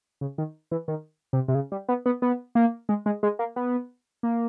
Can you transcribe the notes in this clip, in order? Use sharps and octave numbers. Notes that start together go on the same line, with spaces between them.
C#3
D#3
E3
D#3
C3
C3
C#3
G3
B3
B3
B3
A#3
G#3
G#3
G#3
A#3
B3
A#3